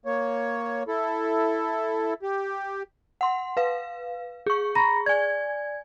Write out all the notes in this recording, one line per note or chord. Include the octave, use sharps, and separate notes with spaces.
A#3 C#5
E4 A4
G4
F#5 C6
B4 F5
G#4 C#6
A#5 B5 A#6
D5 G#5 G#6